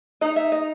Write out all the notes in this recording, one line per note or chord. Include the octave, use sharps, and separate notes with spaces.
D#4 D#5
E5
D#5